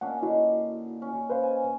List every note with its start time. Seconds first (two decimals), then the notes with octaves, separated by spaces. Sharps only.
0.01 A#2 C#4 D4 F#5
0.23 D3 D#4 E4 F#4
1.02 C#4
1.30 B4 C5 F5
1.43 G#5